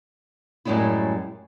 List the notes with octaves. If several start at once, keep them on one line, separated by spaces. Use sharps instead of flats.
F#2 A2 G3 G#3 C#4 E4